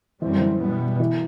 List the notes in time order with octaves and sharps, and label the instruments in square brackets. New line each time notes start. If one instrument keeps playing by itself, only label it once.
[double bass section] F#2 D3 G3 C4 [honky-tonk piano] E3
[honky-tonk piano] E3
[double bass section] B2 G3 B3
[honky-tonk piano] E3